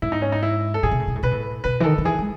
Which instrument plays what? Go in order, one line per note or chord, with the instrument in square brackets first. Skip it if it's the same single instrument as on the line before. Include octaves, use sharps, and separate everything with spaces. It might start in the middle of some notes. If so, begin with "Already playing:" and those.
[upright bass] G#2 [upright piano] E4
[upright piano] D#4
C#4
D#4
E4
A4
[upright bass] A2 [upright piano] G#4
[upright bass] B2
A2
B2
A2
[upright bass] B2 [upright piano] B4
[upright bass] A2
[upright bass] B2 [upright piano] B4
[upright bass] E3
[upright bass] D#3 [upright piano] A4
[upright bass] D#3
[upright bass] E3 [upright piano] G#4
[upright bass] G#3